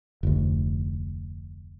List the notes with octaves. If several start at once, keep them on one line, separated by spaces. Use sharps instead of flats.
F1 D2